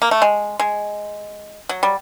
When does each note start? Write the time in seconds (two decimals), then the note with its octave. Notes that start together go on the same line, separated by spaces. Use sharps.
0.02 A#3
0.11 A3
0.22 G#3
0.59 G#3
1.69 F#3
1.83 G3